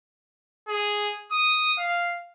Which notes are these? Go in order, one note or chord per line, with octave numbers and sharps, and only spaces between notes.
G#4
D#6
F5